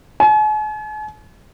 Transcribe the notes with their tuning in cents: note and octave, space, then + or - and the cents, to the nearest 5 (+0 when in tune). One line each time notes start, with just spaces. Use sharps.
G#5 +45